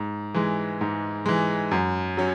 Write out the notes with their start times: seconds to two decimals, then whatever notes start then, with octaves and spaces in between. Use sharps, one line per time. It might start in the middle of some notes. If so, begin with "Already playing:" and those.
Already playing: G#2
0.34 E3 G#3
0.81 G#2
1.26 E3 G#3
1.71 F#2
2.17 F#3 C#4